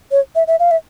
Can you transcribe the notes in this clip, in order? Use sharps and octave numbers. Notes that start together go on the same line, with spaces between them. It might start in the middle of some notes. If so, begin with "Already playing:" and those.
C#5
E5
E5
F5
E5